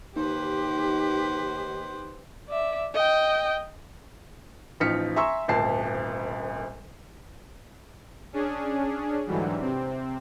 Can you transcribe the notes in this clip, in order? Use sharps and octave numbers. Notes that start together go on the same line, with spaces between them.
D#2 D#4 G4 B4 C5
D5 E5
D#5 G5
A1 F3 D#4 F6 B6 C#7
E5 G#5 A#5 C6 C#6 E6
D#1 G#1 D2 A5 C7
C#4 D4 G#4
G#2 D3 E3 F#3 G3
C3 C4